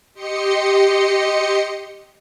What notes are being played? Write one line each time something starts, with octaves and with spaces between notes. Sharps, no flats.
G4 D#5 C6 C#7